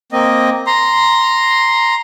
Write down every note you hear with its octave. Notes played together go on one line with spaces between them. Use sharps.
A#3 C4 D#5
A#5 C6